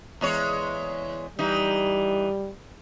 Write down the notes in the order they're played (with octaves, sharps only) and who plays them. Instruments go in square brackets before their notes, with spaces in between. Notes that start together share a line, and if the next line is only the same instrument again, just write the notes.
[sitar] E2 G#3 C#5
[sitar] E3 D#4 [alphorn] G3